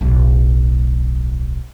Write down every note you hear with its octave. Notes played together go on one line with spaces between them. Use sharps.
D1 B1